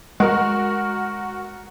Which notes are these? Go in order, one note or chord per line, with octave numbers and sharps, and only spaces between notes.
G#3 F#4 A#4